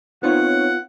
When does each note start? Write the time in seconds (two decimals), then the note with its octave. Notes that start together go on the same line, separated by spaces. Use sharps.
0.23 B3 C4 D#4 F4 C#5 F#5